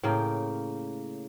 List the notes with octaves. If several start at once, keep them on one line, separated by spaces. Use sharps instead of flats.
A2 C#3 A#3 G5